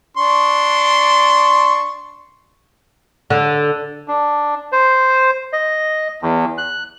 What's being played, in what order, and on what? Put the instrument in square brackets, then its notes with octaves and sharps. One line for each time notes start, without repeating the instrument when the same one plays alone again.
[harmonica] D4 C6 C#6
[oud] D3
[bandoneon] D4
C5
D#5
E2
F#6